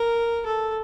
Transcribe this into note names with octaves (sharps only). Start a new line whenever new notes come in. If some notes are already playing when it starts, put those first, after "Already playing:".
Already playing: A#4
A4